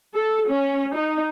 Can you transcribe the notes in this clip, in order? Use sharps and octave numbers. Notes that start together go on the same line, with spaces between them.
A4
C#4
D#4